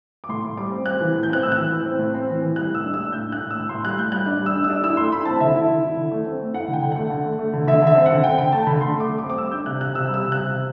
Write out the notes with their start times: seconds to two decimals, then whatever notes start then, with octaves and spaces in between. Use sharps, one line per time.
0.24 D6
0.29 A2 C6
0.44 A2
0.57 G3 D6
0.71 C4
0.86 C4 F#6
1.01 E3
1.14 A2
1.23 G6
1.28 C4 F#6
1.43 A2 E6
1.52 F#6
1.57 E3
1.71 E3
1.85 C4
1.99 A2
2.14 C4
2.28 E3
2.42 E3
2.56 G3 F#6
2.70 A2 E6
2.84 D4
2.94 E6
2.99 A2
3.12 A2 G6
3.27 D4
3.32 F#6
3.42 A2
3.51 E6
3.56 A2
3.69 A2 C6
3.84 G3 F#6
3.98 A2 G6
4.12 G3 F#6
4.26 D4
4.41 G3
4.46 E6
4.56 D4
4.64 E6
4.70 D4
4.83 E4 E6
4.97 A3 C6
5.12 E4 B5
5.25 C4 A5
5.40 D3 E5
5.55 E4
5.68 D3
5.82 E4
5.97 D3
6.12 A3
6.26 C4
6.40 A3
6.53 E4 F#5
6.68 D3
6.73 G5
6.83 D3
6.92 A3 F#5
7.10 D3
7.24 A3
7.39 A3
7.53 D3
7.67 D3 E5
7.82 D3
7.87 E5
7.95 C4
8.06 D3 F#5
8.24 C4 G5
8.38 D3 G5
8.52 A3 A5
8.67 D3 B5
8.81 D3 C6
8.95 A3
9.00 D6
9.09 A3
9.18 D6
9.24 C4
9.30 D6
9.37 G3 E6
9.51 D4 G6
9.66 C3 F#6
9.81 C3 F#6
9.95 C3 E6
10.08 G3
10.14 E6
10.23 C3
10.32 F#6
10.37 C3
10.51 C3